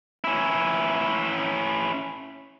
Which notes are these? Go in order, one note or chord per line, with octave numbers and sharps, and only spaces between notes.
C#4 E4